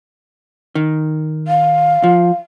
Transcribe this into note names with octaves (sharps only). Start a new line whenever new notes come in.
D#3
F5
F3